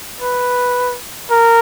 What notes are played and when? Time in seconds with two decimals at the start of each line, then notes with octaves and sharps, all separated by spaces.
0.20 B4
1.30 A#4